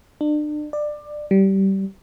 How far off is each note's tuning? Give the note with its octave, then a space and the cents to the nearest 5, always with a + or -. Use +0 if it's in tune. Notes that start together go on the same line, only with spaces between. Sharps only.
D4 +35
D5 +20
G3 -20